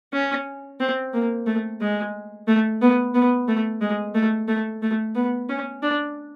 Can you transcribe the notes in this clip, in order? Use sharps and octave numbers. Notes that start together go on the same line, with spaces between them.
C#4
C4
A#3
A3
G#3
A3
B3
B3
A3
G#3
A3
A3
A3
B3
C#4
D4